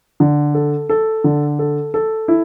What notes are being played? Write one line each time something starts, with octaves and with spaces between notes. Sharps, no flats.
D3
A4
A4
D3
A4
A4
E4